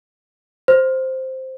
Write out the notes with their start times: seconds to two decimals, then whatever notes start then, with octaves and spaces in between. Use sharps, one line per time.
0.68 C5